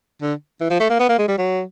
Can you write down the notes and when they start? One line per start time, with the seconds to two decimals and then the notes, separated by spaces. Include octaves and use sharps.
0.22 D3
0.61 E3
0.70 F3
0.80 A3
0.90 A#3
1.00 B3
1.09 A#3
1.19 G#3
1.28 G3
1.38 F#3